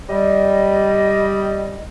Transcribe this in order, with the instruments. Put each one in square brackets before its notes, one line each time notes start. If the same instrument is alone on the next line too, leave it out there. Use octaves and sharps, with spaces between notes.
[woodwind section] G3 D#5